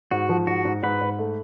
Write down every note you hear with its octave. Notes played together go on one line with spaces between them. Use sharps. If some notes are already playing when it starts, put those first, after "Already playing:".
G#2 F#4
F3
G#2 F#4
G#2
G#2 B4
G#2
A3